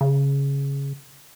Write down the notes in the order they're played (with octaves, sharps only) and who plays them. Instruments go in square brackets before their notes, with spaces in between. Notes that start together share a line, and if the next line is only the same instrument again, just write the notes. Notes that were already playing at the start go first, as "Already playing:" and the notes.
[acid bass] C#3